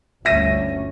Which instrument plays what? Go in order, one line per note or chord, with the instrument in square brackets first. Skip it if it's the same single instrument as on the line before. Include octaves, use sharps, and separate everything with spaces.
[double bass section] G1 D2 C#4 [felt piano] E5 A#6 D#7